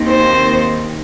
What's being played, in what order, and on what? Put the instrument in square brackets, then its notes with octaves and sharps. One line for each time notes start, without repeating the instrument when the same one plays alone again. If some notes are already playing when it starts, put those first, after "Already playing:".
Already playing: [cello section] D#2 D#3 C4 D#4
[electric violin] C5